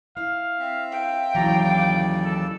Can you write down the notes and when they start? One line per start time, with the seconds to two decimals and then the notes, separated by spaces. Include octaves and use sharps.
0.17 E4 F5
0.59 C4 E5
0.92 F5 G5
1.35 D#2 C#3 E3 F#3 E4 D5 A#5
1.69 D6
2.24 A4